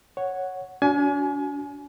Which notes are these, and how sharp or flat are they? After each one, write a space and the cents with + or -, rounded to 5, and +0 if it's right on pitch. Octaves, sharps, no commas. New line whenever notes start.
C#5 +0 F#5 +0
D4 -40 F#4 -5 G#5 +25